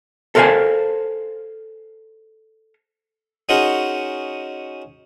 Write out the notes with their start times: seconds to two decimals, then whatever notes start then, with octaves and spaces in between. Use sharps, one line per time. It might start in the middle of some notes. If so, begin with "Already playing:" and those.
0.35 A4 A#4 C5 D5 F5 G#5
3.49 C#4 D#4 F#4 G#4 A#4 C5